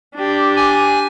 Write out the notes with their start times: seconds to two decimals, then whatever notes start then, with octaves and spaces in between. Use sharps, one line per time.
0.15 D4 G4
0.57 G#5